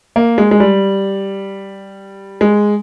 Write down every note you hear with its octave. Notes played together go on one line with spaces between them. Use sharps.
A#3
G#3
G#3
G3
G#3